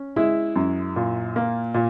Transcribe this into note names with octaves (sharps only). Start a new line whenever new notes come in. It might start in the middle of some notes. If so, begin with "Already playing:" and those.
Already playing: C#4
G#3 E4 E5
F#2
A#2
A#3
A#2